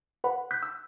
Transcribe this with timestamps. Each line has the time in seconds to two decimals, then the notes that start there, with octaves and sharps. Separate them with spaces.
0.24 B4 F#5 B5
0.51 F#6 G6 B6
0.63 E6